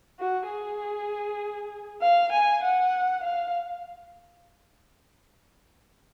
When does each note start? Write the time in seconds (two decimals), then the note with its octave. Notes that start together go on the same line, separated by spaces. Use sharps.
0.19 F#4
0.49 G#4
2.02 F5
2.32 G#5
2.64 F#5
3.24 F5